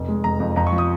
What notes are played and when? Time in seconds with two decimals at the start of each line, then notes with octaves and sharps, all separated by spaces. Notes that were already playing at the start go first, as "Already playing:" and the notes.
Already playing: F1
0.08 G#3
0.24 F1 A#5
0.40 F2
0.56 F2 A#5
0.67 C#6
0.73 F3
0.78 D#6